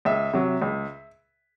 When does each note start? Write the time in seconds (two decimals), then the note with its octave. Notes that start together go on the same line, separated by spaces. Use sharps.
0.05 C#2 E5
0.33 C3 F#3
0.62 C#2